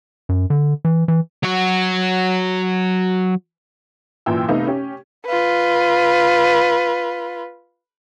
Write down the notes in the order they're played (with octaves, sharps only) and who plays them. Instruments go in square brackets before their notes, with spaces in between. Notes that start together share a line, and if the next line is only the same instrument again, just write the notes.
[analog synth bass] F#2
D3
E3
E3
[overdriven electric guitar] F#3 F#4
[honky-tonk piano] F#2 A#2 E3 G5 E6
C3 A3 B3 D#4 F5
C#4 G4
[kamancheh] F4 B4